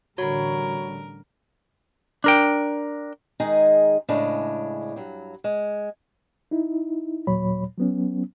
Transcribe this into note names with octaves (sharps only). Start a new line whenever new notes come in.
A1 D3 G3 F#4 A#4 C#5 B5
D4 A#4 G5
D#3 G#3 D#4 G#4 A#5
A2 C#3 G#3 D4
G2 F#3
G#3
D#4 E4
D#2 A#2 F#3 C#5 B5
F#3 B3 C#4